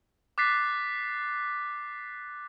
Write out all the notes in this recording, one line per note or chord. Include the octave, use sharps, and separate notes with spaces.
D6 F#6 A6 B6 C7